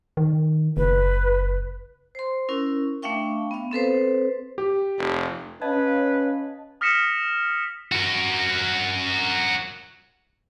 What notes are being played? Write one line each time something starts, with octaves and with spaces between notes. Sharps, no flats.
D#3
F#1 B4
C5 C6
C#4 E4 A#4
A3 D4 E5 F5 G5 C#6
B3 F5
C4 A4 B4 C5
G4
F1
C#4 B4 C#5 D#5 F5 A5 G#6
D#6 F6 A#6 B6 C#7 E7
F#4 A#4